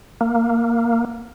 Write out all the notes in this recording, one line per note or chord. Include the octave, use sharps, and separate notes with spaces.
A#3